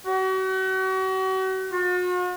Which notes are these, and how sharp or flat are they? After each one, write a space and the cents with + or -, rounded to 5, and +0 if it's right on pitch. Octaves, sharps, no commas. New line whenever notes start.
F#4 +40
F#4 -45